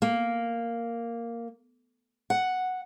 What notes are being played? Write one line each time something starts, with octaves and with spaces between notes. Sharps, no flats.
A#3
F#5